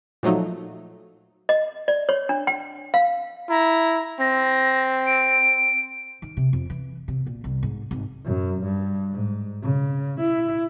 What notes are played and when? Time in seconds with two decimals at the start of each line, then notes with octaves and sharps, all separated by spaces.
0.23 A#2 F3 F#3 A3 D#4
1.49 D#5
1.88 D5
2.09 C#5
2.29 D4
2.47 G5
2.94 F5
3.49 E4 A#5
4.20 C4 A#6
5.06 D7
6.22 D#3
6.37 C3
6.53 F2
6.70 E3
7.08 C3
7.27 A#2
7.44 C2
7.63 G#2
7.91 G#1
8.24 F#2
8.63 G2
9.12 G#2
9.63 C#3
10.20 E4